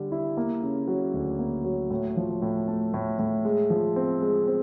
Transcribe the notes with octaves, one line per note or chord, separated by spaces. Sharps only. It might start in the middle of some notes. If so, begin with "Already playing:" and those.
Already playing: D3 G3
E4
A#3
C#3
F#3
D2
A#3
F#3
A2
F3
A2
A3
A2
A2
G#3
F3
C4
G#3
C4